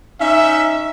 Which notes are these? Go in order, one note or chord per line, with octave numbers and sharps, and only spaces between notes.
C#4 D#4 E5